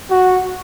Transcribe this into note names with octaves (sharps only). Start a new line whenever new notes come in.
F#4